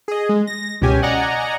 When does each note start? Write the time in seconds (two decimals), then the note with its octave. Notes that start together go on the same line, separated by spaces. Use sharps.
0.08 G#4 D#5
0.29 G#3
0.47 A#6
0.82 C#2 B2 C#4 G4 G#5
1.02 D5 D#5 F#5 G#5 A#5